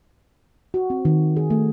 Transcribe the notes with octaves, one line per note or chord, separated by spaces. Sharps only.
F#4
C4
D#3
G#4
A3